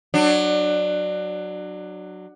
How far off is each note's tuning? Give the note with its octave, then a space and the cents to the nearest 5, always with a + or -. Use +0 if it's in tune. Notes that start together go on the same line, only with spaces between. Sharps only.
F#3 +5 D4 +25